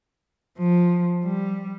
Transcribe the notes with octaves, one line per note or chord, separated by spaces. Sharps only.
F3
G3